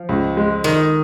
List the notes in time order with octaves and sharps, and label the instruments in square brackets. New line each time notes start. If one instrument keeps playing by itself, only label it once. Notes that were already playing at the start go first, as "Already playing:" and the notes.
Already playing: [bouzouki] F3
[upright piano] C#2
G#3
[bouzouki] D#3 [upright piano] D#4